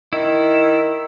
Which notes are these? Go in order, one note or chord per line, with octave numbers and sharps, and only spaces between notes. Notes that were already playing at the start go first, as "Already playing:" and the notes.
D#3 E4